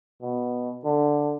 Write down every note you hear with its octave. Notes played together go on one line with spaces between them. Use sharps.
B2
D3